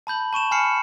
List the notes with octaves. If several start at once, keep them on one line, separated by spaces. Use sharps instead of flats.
A5 B5 G6 F#7
A5 C#6 D#7 E7
G#5 B5 F6 C7 C#7 E7